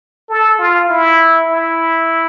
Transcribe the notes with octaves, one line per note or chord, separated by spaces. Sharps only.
A4
F4
E4
E4